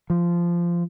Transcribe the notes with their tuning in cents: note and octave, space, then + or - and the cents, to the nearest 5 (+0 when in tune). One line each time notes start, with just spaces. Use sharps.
F3 -15